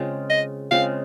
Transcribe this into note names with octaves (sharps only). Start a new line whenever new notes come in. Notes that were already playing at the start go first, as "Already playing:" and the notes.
Already playing: C#3 G#3 C4 F4
D#5
C#3 G#3 C4 F4 F5